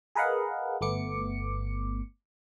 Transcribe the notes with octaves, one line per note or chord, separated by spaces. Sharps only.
G#4 A#4 B4 D#5 F5 F#5
G1 A3 B3 D6 C#7